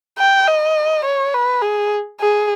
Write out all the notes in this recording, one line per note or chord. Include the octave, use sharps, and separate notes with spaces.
G5
D#5
C#5
B4
G#4
G#4